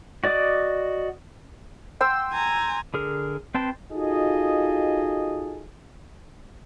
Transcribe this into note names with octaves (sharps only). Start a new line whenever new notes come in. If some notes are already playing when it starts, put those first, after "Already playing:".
F#4 D5 D#5 D6
G5 C6 E6
G#5 A#5
D3 G#4 A#4
C4 B4 G5 A5 C6
D#4 F4 F#4 G#4 A4 D#5